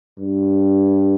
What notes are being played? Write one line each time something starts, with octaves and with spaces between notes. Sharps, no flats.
G2